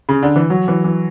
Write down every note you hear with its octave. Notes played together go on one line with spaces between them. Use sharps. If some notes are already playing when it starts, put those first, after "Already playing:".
C#3
D3
E3
F#3
E3
E3